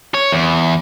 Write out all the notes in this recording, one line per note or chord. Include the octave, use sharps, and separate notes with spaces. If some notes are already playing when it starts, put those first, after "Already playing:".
C#5
E2